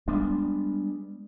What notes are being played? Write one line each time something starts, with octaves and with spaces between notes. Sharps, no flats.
G3 G#3 B3 D4